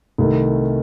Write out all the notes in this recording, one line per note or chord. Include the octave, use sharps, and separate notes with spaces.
C2 C3 D#3 A3